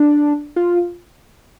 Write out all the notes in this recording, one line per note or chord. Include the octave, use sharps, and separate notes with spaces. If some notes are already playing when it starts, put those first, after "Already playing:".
Already playing: D4
F4